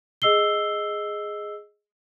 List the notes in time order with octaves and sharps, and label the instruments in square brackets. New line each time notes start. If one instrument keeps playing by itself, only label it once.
[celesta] G#4 D#5 E6 C7 G7